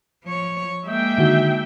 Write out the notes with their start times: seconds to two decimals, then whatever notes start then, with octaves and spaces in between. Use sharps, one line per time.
0.24 F3 C#5
0.86 G#3 A#3 E5 G5
1.18 D3 D#3 F#4